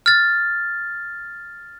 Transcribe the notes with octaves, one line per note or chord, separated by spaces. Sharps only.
F6 A6